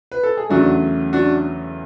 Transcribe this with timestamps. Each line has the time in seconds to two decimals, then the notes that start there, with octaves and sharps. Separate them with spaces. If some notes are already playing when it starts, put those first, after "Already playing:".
0.12 B4
0.23 A4
0.37 G#4
0.49 E2 C#3 F#3 A3 D4 F#4
1.13 D4 F#4